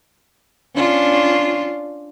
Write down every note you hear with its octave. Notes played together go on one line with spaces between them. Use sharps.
C#4 D4 F4